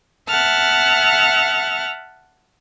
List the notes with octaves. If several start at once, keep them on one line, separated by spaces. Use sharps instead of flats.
E5 F#5 A5 F6